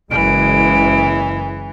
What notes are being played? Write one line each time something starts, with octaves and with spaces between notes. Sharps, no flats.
F#1 E3 G#3 D7